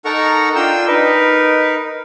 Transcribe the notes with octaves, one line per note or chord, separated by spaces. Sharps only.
D#4 A4 A#4 F#5 A#5 C#6
D4 F4 G5 E6
D#4 A#4 B4